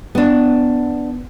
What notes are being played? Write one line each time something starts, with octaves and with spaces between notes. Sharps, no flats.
B3 D4